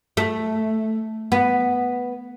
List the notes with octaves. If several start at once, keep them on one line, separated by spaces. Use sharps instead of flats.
A3
B3